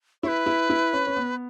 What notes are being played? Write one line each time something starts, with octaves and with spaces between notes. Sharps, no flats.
E4 B4 C#5
E4
E4
C#4
C#4
B3